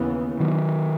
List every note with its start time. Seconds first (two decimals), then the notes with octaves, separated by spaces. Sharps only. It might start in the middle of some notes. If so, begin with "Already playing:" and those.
Already playing: D#2 C#3 E3 B3
0.40 D#3 F#3